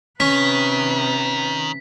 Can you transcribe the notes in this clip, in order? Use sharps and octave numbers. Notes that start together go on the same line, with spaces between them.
C3 D#3 C#4 B4 B6